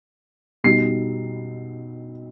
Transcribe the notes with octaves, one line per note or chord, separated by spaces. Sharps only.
B2 G3 D#4 C7